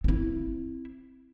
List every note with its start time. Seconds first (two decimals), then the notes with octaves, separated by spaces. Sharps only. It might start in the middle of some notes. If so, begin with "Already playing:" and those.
0.04 C4 E4